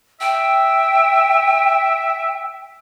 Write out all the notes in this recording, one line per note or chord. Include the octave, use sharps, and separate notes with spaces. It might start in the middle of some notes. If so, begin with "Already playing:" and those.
E5 G5